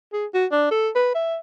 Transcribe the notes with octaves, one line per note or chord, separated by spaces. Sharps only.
G#4
F#4
D4
A4
B4
E5